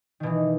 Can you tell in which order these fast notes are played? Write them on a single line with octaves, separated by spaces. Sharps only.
D#3 B2 E3